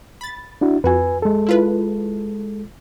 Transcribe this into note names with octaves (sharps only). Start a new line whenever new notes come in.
B5 A6
D4 E4 F#4
F2 F#4 B4 G#5
G#3 A4
E4 F4 B4